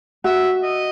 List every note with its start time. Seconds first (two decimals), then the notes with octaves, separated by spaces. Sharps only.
0.24 F#4 E5
0.63 D#5